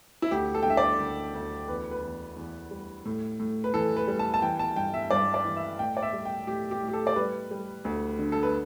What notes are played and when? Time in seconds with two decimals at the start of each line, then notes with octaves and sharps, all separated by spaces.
0.22 E4
0.31 D2 G4
0.54 A4
0.63 G5
0.66 D3 E5
0.77 D5
1.00 D2
1.34 D2
1.68 E2 B4
1.91 B4
2.03 E2
2.37 E2
2.71 G3
3.05 A2
3.39 A2
3.64 B4
3.74 E3 A4
3.97 B4
4.08 G3
4.19 A5
4.34 A5
4.42 E3 G5
4.59 A5
4.76 G2 G5
4.94 E5
5.11 G2 D5
5.34 D5
5.45 E3
5.56 E5
5.79 A2 G5
5.97 D5
6.02 E5
6.13 G3
6.25 G5
6.47 A2 G4
6.71 G4
6.82 A2
6.88 G4
6.93 A4
7.07 D5
7.16 G3 B4
7.51 G3
7.85 D2
8.19 D3
8.32 A4
8.43 B4